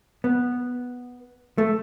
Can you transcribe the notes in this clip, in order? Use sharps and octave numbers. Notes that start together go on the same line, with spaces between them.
B3
A3